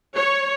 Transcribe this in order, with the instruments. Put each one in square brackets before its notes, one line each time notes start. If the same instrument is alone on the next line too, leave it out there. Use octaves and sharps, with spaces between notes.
[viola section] C#5